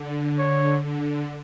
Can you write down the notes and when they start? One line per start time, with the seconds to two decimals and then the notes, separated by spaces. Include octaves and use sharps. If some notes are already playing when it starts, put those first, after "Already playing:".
Already playing: D3
0.38 C#5
0.84 D3